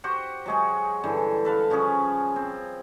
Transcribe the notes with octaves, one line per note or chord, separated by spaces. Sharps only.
F#4 G4 C5 F#5
F#3 G#3 G#4
G2 D3 E3
A4 B4 F5
C#3 F3 C#4 G#4
C4